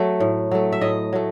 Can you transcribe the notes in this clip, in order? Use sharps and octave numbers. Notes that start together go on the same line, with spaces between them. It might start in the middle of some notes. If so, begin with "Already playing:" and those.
Already playing: F#3 A3
A2
F#3 A3
E5
A2 D#5
F#3 A3